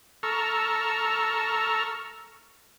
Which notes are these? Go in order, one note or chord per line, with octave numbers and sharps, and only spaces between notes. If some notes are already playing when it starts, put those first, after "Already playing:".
A4 A#5 C#6 E6 F6